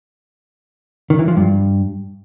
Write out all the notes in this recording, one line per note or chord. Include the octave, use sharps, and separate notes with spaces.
D#3
E3
F3
G2